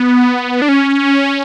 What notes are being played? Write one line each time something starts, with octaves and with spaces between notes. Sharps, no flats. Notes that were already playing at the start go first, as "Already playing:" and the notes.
Already playing: B3
D4
C#4